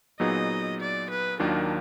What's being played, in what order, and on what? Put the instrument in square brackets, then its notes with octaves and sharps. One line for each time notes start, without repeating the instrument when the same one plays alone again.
[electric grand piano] A#2 F#3 B3 D#4 G#4 [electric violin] D#5
[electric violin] D5
B4
[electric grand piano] D#2 D#3 F#3 A#3 D4 [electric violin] F4